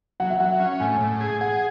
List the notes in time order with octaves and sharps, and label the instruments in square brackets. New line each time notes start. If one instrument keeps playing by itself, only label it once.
[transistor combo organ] F#3 [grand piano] F#5
[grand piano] E5
[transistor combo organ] F#3 [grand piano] F#5
[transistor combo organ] C#4
[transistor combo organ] A2 [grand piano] G#5
[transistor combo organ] A2
G#4
[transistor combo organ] G#4 [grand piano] F#5